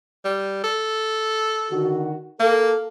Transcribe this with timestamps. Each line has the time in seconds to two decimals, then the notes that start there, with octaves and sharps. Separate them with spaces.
0.24 G3
0.64 A4
1.71 D3 D#3 F#4
2.40 A#3 A4